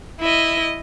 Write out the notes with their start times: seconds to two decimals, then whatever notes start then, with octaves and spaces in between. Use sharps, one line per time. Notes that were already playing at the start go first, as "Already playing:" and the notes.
0.19 E4 D#5